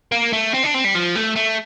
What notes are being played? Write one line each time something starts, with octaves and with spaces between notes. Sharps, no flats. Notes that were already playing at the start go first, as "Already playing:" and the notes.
A#3
A3
C4
D4
C4
G3
F3
A3
A3